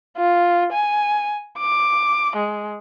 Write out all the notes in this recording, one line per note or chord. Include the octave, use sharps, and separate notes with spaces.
F4
G#5
D6
G#3